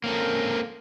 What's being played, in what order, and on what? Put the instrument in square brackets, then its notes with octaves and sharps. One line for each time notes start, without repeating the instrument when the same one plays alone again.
[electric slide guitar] A#3 C4 A4 [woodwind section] C#4 A#4